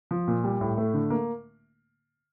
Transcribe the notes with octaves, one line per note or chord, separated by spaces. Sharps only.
F3
A#2
G3
A2
A3
D3
A#3